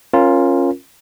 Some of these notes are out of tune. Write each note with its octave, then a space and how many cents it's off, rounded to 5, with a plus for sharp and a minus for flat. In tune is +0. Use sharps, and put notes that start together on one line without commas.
C#4 -20 F4 +0 A#4 +5